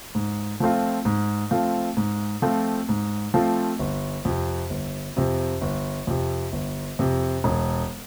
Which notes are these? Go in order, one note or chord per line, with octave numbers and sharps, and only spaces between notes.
G#2
F3 A3 C4 F4
G#2
F3 A3 C4 F4
G#2
F3 A3 C4 F4
G#2
F3 A3 C4 F4
G1
F2 C3
G1
F2 C3
G1
F2 C3
G1
F2 C3
E1